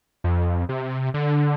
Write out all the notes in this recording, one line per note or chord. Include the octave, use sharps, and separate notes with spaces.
F2
C3
D3